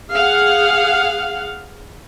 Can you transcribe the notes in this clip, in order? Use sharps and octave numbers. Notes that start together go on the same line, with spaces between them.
G#4 F5 F#5